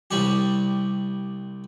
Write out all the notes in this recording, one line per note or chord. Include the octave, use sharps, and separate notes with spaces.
C2 G3 G4